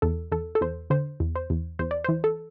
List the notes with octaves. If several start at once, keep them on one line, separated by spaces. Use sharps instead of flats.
E2 A4
E2 A4
A4
E2 C5
D3 C5
E2
C5
E2
E2 C5
D5
E3 C5
A4